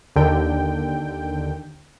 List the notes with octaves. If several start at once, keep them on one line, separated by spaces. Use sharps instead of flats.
D#2 D3 G5